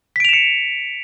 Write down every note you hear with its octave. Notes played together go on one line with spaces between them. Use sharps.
B6 C#7 D7 E7 F7